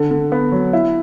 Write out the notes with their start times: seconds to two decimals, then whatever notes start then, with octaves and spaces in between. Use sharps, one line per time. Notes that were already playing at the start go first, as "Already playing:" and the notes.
Already playing: D3
0.11 D3
0.32 B3
0.52 F#3
0.73 E4